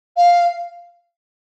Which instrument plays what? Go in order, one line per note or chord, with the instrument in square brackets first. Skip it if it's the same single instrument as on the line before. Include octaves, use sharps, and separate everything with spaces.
[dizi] F5